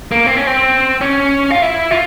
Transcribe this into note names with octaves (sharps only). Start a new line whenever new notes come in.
A#3
C4
C#4
C4
C#4
F4
E4
F4